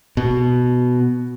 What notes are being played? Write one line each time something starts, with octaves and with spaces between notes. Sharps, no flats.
B2